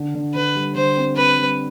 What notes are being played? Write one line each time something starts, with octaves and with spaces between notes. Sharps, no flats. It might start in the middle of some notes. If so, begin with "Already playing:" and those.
Already playing: D3
D3
D3 B4
G3
D3 C5
C4
C4 B4
G3